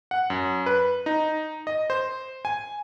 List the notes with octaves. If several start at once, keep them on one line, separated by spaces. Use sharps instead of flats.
F#5
F#2
B4
D#4
D#5
C5
G#5